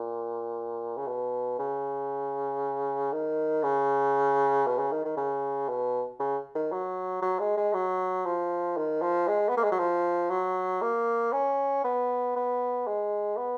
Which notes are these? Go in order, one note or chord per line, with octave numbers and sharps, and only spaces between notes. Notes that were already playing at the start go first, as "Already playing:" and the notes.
Already playing: A#2
C#3
B2
C#3
D#3
C#3
B2
C#3
D#3
D#3
C#3
B2
C#3
D#3
F#3
F#3
G#3
G#3
F#3
F3
D#3
F3
G#3
B3
A#3
G#3
F#3
F3
F#3
A#3
C#4
B3
B3
G#3
B3